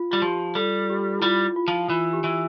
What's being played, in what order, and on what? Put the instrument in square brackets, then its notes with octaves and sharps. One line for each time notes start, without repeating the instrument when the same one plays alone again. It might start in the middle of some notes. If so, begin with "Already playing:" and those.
Already playing: [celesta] F4
[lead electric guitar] G3 [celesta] F4
[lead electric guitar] F3 [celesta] G4
[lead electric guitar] G3 [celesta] A4
[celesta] G4
E4
[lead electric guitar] G3 [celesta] F4
[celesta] F4
[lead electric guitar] F3
[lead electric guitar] E3 [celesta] F4
[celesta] G4
[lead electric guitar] E3